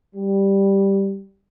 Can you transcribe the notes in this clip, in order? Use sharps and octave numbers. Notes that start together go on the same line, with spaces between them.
G3